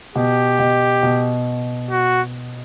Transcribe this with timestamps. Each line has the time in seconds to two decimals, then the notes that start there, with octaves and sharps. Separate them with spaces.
0.15 B2 G4
0.59 B2
1.03 B2
1.91 F#4